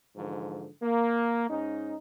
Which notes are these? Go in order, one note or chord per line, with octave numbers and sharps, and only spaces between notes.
G#2 D3 E3 F3
A#3
G#2 C#4 D#4